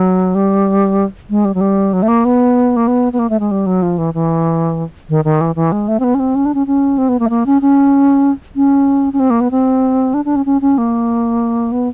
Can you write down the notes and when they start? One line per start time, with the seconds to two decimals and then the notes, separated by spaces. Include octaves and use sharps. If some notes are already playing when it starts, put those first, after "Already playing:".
Already playing: F#3
0.35 G3
1.30 G#3
1.45 G3
1.55 F#3
1.61 G3
1.93 F#3
2.03 A3
2.08 A#3
2.25 B3
2.76 A#3
2.88 B3
3.13 B3
3.19 A#3
3.30 A3
3.40 G#3
3.51 G3
3.66 F#3
3.82 F3
3.98 E3
4.14 E3
5.09 D#3
5.25 D#3
5.41 E3
5.56 E3
5.72 G#3
5.88 A3
6.00 C4
6.04 B3
6.15 C#4
6.20 C4
6.35 C#4
6.46 D4
6.54 C#4
6.67 C#4
6.98 C4
7.09 B3
7.20 A#3
7.26 A3
7.30 A#3
7.46 C#4
7.62 C#4
8.56 C#4
9.13 C#4
9.20 C4
9.30 A#3
9.41 B3
9.51 C4
10.14 D4
10.25 D4
10.36 C#4
10.46 C#4
10.62 C#4
10.78 A#3
11.72 B3